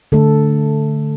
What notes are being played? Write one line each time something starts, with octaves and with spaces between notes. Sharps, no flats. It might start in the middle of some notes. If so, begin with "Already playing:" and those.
D3 A3 A4